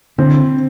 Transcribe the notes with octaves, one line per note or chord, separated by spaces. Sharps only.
D3 C4